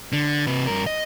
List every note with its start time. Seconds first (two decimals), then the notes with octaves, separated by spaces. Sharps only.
0.13 D3
0.47 C3 B4
0.67 G2 A#4
0.86 D#5